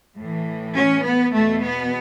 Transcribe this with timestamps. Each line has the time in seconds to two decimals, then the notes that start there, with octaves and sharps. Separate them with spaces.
0.16 A2 E3
0.75 C#4
1.05 B3
1.34 E2 B2 A3
1.64 B3